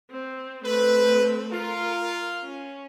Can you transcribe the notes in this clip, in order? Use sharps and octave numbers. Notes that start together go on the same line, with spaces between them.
C4
A3 C4 B4
F4 A#4
C#4